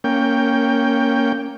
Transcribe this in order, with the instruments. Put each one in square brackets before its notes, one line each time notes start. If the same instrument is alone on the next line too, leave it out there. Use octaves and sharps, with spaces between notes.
[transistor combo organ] A#3 C#4 G5